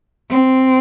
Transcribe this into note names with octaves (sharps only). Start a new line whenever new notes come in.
C4